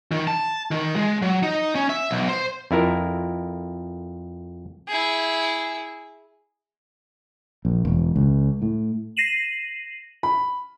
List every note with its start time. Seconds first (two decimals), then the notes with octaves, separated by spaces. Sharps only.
0.12 D#3
0.27 A5
0.71 D#3
0.96 G#3
1.22 F#3
1.43 D#4
1.75 C#4
1.89 E5
2.11 B1
2.29 C5
2.71 F2 E4 A#4
4.88 E4 G#4
7.65 A#1
7.85 E1
8.16 C#2
8.62 A2
9.17 A#6 C7 D#7 E7 F#7
10.23 B5